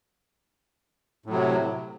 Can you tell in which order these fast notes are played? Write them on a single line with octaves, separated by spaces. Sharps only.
A2 F#3 C3